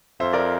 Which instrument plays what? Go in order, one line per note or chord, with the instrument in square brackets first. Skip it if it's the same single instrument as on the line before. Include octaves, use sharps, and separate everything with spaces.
[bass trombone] F2 [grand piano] C5 E5
[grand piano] A#4 D5